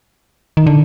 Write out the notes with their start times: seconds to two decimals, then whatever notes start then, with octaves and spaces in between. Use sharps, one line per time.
0.57 D#3
0.67 D3